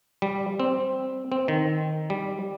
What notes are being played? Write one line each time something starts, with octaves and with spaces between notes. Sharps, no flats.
G3
C4
C4
D#3
G3